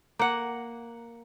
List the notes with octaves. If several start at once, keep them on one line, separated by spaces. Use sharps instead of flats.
A#3 F#5